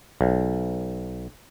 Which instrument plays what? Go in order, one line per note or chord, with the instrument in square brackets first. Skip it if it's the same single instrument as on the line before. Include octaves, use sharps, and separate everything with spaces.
[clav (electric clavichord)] B1